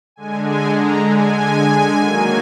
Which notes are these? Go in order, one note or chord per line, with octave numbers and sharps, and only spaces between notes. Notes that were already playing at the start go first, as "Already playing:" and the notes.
D3 G#3 G#5
G#5
A#5
G#5
D#3 F#3 A#3